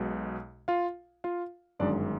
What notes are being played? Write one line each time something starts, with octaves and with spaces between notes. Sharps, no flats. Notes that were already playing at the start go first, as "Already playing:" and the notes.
Already playing: B1 B2 G#3
F4 F5
F4 F5
G1 F#2 D#3 G#3 D4 D5